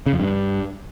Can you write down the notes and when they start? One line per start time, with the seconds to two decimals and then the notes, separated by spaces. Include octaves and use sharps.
0.06 C#3
0.13 F2
0.20 G2